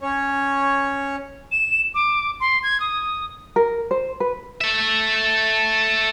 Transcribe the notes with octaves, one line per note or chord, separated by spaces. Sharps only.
C#4 C#5
E7
D6
C6
G#6
D#6
A#4
C5
B4
A4 E5